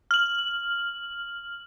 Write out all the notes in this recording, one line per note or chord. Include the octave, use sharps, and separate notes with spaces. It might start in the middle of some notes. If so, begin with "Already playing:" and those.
F6 F#7